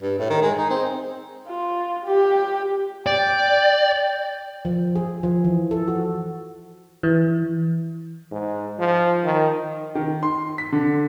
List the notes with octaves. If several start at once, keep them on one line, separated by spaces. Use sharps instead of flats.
G2
A2
D#3
G#3
D#4
C4
F4
G4
D5 G5
F3
G#4
F3
E3
A4
F#4
E3
G#2
F3
D#3
D#3
C6
B6
D3